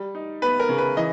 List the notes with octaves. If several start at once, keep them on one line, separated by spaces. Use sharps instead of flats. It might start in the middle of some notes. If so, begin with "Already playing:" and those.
Already playing: G3
D#4
B3 B4
A#4
C#3
B4
E3 D#5